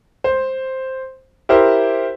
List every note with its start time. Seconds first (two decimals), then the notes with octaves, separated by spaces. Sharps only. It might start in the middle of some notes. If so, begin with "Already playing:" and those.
0.24 C5
1.49 E4 G4 A#4 C5